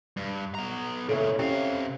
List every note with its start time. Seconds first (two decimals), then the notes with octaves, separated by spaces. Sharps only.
0.17 G2
0.55 B3 A#5
1.09 A#2 C#3 E3 E4 A4 C#5
1.39 C3 C#4 G4 E5 F5 G5